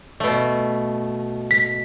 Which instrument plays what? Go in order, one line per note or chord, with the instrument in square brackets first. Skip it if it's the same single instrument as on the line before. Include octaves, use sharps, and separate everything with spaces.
[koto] B2 A3
[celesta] B6